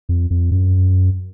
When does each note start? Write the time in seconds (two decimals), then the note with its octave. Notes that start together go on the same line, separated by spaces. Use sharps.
0.09 F2
0.30 F2
0.51 F#2